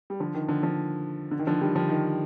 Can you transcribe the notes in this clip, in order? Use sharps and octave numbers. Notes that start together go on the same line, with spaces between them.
G3
D3 F3
D#3
D3 F3
D3 F3
D3
D#3
D3 F3
D#3 G3
D3 F3
D#3